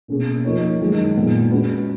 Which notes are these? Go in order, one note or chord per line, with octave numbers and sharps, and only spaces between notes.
B2 A#3 C#4 G#4
F3 A#3 D#4 A#4 C#5
F#2 D#3 G#3 D#4 G#4
A#2 G#3 B3
G#3 C#4 F#4 B4